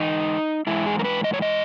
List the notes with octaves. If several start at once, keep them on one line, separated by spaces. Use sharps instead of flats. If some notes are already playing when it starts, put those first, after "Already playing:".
Already playing: G#2 E3 D#4
G#2 E3 G#3 E4
G#4
A#4
B4
D#5
C#5
D#5